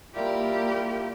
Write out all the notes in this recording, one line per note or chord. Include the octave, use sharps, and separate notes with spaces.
G3 A#3 E4 F4 G4 A#4